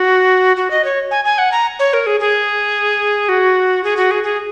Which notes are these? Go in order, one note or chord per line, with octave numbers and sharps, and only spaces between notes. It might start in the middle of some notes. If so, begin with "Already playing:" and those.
Already playing: F#4
F#4
D#5
C#5
G#5
G#5
F#5
A#5
C#5
A#4
G#4
G#4
F#4
G#4
F#4
G#4
G#4